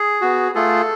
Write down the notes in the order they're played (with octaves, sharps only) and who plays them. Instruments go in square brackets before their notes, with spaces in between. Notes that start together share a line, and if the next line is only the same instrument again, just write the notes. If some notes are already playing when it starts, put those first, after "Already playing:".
Already playing: [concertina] G#4
B3 F#4
A3 F4 G#4 A4